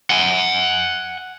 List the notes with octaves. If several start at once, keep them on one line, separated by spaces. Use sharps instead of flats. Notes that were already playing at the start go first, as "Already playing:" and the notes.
F#5 G#5